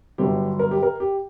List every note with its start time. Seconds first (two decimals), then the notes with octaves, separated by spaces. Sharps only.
0.18 G1 G2 D3 F#3 B3 G4
0.59 A#4
0.71 G4
0.82 A#4
1.00 G4